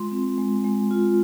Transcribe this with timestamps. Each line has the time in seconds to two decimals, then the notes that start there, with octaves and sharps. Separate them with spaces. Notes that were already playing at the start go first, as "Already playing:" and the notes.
Already playing: G#3 F4 C6
0.12 C4
0.38 G#3
0.64 G#3
0.91 F4